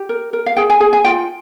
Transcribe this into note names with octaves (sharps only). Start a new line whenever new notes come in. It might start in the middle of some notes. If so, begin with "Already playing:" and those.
Already playing: G4
A#4
A#4
F5
G#4 G5
G#5
G#4 G#5
G#5
F4 G5